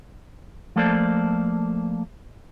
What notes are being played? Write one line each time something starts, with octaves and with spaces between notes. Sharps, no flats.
F3 A3 A#3 A4 C5 D5